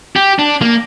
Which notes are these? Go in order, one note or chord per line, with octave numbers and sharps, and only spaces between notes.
G4
D4
A#3